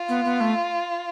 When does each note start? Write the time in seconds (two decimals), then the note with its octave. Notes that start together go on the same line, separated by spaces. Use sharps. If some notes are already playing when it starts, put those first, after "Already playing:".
Already playing: F4
0.09 B3
0.25 B3
0.41 A3